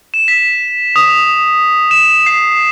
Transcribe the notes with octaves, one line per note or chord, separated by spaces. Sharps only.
E7
B6
D#6
E7
C7